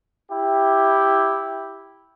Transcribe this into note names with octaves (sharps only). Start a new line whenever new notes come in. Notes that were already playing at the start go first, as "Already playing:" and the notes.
E4 G4